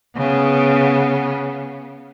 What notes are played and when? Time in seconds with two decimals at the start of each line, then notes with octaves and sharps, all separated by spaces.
0.17 C#3 B3